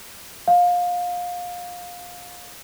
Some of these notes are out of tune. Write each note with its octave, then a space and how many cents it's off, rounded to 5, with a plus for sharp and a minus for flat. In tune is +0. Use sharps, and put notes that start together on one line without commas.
F5 +25